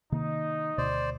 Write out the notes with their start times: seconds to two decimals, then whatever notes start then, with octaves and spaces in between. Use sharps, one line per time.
0.12 C3 D#3 A#3 D#4
0.78 D2 B2 C5 D5